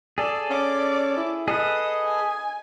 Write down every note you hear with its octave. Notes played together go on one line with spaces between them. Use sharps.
G#4 A4 D5
C#4 D5 D6
E4
G#4 A4 B4 D#5 D#6
G#5